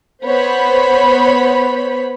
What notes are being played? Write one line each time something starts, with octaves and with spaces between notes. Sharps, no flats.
B3 C5 C#5 B5